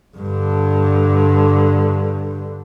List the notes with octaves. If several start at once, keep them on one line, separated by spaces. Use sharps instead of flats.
G2 D3